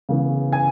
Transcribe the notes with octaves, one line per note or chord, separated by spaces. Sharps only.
C#3 E3 B3
G#5